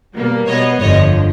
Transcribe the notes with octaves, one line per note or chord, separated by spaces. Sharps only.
B2 G3 A#3
B2 G3 B3 C#5 D#5
G1 F2 D3 F3 C#5 D#5